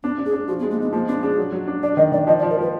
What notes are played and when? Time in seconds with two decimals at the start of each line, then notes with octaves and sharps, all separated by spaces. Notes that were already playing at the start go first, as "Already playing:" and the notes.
0.03 B3 D4
0.18 D4
0.26 G#4
0.33 D4
0.48 F3 F#4
0.59 B3
0.62 G#3
0.71 A#3
0.78 B3 D#4
0.93 F3 A#3
1.08 B3 D4
1.23 D4 G#4
1.38 F#3
1.52 F#3
1.67 D4
1.83 D4 D5
1.97 D#3 D#5
2.12 D#3 D5
2.27 F3 D#5
2.39 D5
2.43 F3
2.50 A#4
2.58 F3 B4